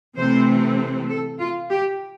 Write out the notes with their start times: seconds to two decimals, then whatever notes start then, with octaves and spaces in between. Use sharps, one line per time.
0.16 C3 E3 A3 C4 C5
1.09 A4
1.39 F4
1.70 G4